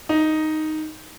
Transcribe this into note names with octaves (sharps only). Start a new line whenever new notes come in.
D#4